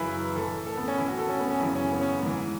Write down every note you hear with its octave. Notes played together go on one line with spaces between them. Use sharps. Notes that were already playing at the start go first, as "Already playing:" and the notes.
Already playing: F#2 C#3 E3 E4 B4
A2 E3 A4
A4
B3
C#4
A2 E3 E4
F#4
A4
C#4
B3
C#4
F#2 C#3 E3 E4
C#4
B3
C#4
G#2 E3